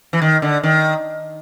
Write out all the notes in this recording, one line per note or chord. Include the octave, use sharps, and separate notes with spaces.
E3
D#3
D3
D#3